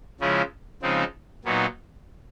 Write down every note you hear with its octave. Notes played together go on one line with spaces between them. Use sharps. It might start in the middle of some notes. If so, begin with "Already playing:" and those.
C#3 F3 G#3 C#4 E4
C#3 F3 G#3 C4 D#4
A#2 F#3 B3 D#4